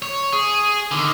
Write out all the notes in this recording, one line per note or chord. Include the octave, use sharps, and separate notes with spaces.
C#5
G#4
D3 D#3